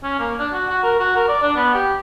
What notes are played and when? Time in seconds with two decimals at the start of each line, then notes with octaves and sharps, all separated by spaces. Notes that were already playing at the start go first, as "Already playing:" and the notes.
0.04 C#4
0.19 A#3
0.39 D4
0.53 F#4
0.69 F#4
0.84 A#4
1.00 F#4
1.16 A#4
1.28 D5
1.42 D4
1.56 B3
1.74 G4